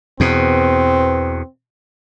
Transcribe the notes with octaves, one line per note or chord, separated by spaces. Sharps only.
E2 B2 C4